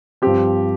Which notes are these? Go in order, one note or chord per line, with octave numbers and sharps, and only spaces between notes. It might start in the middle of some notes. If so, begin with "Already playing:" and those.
G2 F3 C4 G4